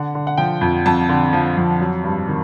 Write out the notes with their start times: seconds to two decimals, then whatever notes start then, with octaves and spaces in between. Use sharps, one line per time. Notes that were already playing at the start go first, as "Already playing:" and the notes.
Already playing: D3 F#5
0.15 D3
0.27 F#5
0.38 F3 G5
0.61 F2
0.86 F2 A5
1.09 D3
1.33 F3
1.57 F2
1.80 F#3
2.04 G2
2.28 D#3